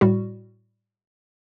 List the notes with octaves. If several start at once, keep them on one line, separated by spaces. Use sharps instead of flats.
A2 G3 F#4